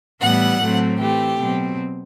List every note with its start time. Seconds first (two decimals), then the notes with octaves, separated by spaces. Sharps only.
0.21 A2 E3 G3 B3 F#5
0.59 A2 F#3 A3 C4
0.98 E3 A3 C4 G4
1.38 B2 F#3 C4